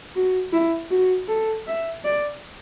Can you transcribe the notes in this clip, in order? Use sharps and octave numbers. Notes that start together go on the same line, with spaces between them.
F#4
E4
F#4
A4
E5
D5